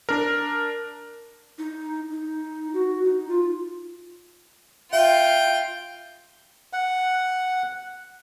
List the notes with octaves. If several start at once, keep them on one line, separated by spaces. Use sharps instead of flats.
D4 A#4
D#4
D#4
F#4
D#4
F4
F4 E5 G5
F#5